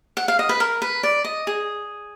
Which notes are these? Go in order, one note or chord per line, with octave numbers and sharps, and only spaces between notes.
F#5
F5
D#5
B4
A#4
B4
D5
D#5
G#4